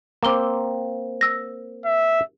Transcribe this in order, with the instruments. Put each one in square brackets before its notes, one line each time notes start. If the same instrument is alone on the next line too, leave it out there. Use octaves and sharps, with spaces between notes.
[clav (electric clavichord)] A#3 C4 [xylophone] A#5 D6 G7
[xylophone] E6 A#6
[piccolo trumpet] E5